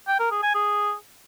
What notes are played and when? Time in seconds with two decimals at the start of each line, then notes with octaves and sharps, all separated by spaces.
0.08 G5
0.20 A#4
0.31 G#4
0.43 G#5
0.54 G#4